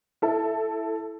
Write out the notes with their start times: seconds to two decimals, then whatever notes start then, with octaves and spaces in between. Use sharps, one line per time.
0.22 E4 A4